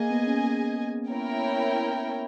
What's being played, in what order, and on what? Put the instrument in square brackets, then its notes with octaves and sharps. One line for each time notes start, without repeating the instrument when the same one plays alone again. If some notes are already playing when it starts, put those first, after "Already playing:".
Already playing: [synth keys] A#3 [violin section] G#4 D#5 G#5
[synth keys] B3
C#4
A#3
[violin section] E4 A#4 C#5 G5